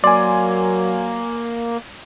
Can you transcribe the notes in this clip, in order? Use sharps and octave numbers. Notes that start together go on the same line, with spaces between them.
F#3 A#3 D5 G#5 C6